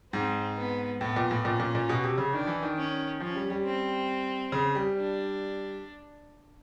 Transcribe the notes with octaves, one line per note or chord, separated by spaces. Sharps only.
G#2 C4
B3
A2 B3
A#2
A2
A#2 C#4
A#2
A#2
B2
C3
C#3
D#3 D4
E3
D#3
C#4
F3 C#4
G3
G3
C4
C#3
G3
D4